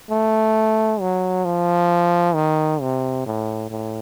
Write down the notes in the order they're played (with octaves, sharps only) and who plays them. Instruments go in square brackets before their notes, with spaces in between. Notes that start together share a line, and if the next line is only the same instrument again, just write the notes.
[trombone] A3
F#3
F3
D#3
C3
A2
A2